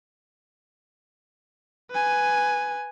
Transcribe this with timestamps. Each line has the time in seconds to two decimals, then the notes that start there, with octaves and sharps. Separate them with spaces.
1.91 B4 G#5